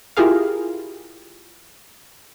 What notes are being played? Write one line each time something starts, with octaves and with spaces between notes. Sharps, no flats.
E4 F4 G4 G#4 A#4 F5